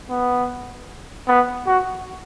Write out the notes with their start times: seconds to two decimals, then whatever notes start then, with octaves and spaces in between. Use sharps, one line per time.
0.10 B3
1.28 B3
1.67 F#4